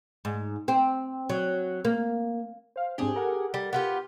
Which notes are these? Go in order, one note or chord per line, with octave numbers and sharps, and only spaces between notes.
G#2
C4
F#3
A#3
C5 F5
G#2 C4 D4 G4 G#4
A4 A#4 F#5
G3
B3 F4 G4